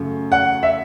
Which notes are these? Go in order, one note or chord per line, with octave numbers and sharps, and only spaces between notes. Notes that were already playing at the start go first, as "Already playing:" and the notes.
Already playing: F#2 C#3 A3
F#5
E5